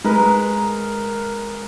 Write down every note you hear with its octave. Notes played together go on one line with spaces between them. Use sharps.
G#3 A#4 B4